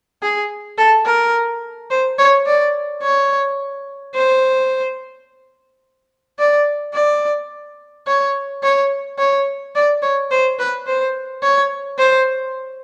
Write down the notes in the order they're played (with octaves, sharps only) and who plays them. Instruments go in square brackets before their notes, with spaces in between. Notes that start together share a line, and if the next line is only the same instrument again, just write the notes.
[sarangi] G#4
A4
A#4
C5
C#5
D5
C#5
C5
D5
D5
C#5
C#5
C#5
D5
C#5
C5
B4
C5
C#5
C5